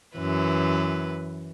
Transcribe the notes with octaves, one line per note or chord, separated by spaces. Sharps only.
F#2 E3 B4